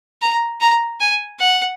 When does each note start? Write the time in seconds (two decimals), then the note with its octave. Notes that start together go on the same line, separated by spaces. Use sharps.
0.22 A#5
0.61 A#5
1.00 G#5
1.39 F#5